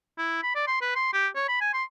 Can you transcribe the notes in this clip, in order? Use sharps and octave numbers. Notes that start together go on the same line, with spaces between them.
E4
B5
D5
C6
B4
C6
G4
C#5
B5
G#5
C6